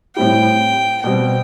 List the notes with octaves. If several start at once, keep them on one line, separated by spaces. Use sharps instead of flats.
A2 G3 C4 E4 G4 G5
B2 G3 C4 G5